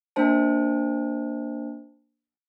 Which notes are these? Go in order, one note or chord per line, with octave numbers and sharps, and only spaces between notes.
A#3 D4 C5 A5